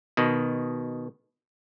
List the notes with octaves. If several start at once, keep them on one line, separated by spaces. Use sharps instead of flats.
B2 D#3